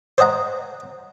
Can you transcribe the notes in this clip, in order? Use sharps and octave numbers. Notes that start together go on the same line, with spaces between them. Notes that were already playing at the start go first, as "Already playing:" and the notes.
C5 C#5 D#5 F#5 A#5